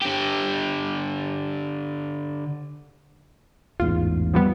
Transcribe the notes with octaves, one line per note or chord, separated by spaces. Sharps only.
D3 G4
A1 E2 G#2 F4
F3 G3 B3